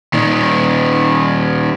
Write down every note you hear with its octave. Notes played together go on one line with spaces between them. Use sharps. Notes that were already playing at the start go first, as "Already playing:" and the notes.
A#2 D#3